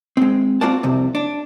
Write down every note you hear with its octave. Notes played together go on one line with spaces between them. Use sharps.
G#3 C4
C4 F4 F#4 D5 F#5 A5
C2 F2 C3
D4